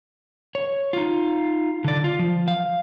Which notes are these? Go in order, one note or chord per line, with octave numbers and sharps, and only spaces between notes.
C#5
D#4 F4
D3 D5
F4
F3
F5